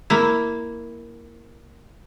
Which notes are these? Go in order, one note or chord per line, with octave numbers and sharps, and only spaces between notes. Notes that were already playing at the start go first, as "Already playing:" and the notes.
A#3 E4